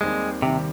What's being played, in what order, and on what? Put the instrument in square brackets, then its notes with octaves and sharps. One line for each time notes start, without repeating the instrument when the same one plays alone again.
[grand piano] D#2 D#3 G3 C4 [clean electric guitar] G#3
[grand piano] D#2 D#3 G3 C4 [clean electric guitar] C3